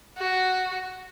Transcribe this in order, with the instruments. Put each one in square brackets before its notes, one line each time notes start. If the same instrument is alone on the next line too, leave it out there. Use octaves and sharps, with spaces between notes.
[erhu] F#4